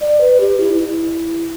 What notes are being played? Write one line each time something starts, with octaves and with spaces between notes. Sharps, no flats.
D5
B4
G4
E4
E4